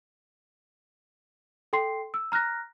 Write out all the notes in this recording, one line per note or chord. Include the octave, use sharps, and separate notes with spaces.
A4 G5 C6 C7
E6
A#5 F6 F#6 A#6